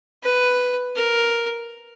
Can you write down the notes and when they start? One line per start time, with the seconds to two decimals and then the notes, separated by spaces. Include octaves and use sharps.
0.23 B4
0.96 A#4